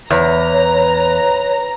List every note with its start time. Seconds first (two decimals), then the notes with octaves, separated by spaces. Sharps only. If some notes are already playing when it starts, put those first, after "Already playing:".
0.11 E2 B4 C#5 A#5